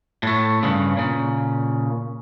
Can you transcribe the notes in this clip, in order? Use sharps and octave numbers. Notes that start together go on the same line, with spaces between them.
A2 A3
G2 C#3
A#2 C#3